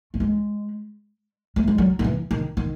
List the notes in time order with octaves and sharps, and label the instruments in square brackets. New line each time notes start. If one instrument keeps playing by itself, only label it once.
[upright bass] A3
G#3
A3
G#3
F#3
D#3
E3
D#3
D#3